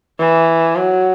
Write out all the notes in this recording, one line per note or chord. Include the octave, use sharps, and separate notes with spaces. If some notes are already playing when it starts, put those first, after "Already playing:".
E3
F#3